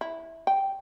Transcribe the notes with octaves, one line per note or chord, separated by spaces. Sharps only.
E4
G5